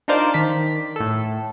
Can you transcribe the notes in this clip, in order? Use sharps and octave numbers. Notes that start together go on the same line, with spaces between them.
D4 D#4 F4 A#4 C5 D5
D#3 B6
A2 A4